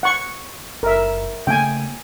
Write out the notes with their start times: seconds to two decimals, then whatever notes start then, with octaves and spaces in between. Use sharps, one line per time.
0.03 F#5 C#6
0.83 F#1 A#4 E5
1.47 C#3 A3 A#3 G5 G#5